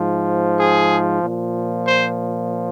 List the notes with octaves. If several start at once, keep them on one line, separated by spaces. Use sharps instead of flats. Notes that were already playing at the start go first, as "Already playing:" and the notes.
Already playing: G#2 F3
G#4
A#2 F3
C5